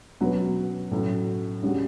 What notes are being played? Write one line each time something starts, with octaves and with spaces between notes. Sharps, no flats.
B2 F#3 C#4 F#4 B4
A2 F#3 C#4
C#3 G3 C#4 F#4